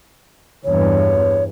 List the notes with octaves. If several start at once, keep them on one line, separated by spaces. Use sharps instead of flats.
E2 G2 E3 C#5